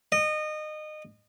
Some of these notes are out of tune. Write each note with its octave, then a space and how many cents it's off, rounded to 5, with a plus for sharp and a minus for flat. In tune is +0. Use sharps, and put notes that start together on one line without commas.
D#5 -25